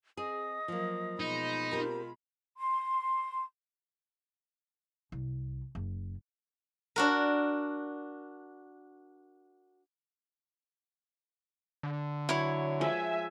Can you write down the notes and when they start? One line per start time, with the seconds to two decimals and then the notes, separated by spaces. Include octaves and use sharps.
0.17 C4 G#4 D#5 D#6
0.68 F3 F#3 A#3
1.20 B2 G#3 D#4 B5
1.71 C4 F4 G4 A#4
2.57 C6
5.12 C2
5.75 F#1
6.96 D4 F#4 A#4
11.83 D3
12.29 F#3 E4 C#5
12.81 F3 G#3 E5 G#5